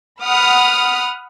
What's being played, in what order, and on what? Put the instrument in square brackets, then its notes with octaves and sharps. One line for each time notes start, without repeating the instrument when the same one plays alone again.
[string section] F#5 B5 D#6 F6